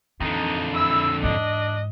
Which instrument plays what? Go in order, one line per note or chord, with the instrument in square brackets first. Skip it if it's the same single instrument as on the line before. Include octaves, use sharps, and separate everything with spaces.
[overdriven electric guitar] F2 D3 [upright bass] E3 [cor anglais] D#4
[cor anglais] E4 [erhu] E6
[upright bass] E2 G#2 [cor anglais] D4 [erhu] D#5